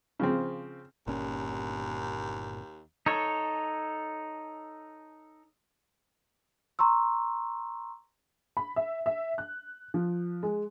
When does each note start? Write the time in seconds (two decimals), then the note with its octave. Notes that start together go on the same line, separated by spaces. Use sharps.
0.20 C#3 F3 C4
1.07 G1 D#2 A#2 C#4
3.06 D#4 A4 C#5
6.79 A#5 C6 C#6 E6
8.57 B5
8.76 E5
9.06 E5
9.38 F#6
9.94 F3
10.43 G#3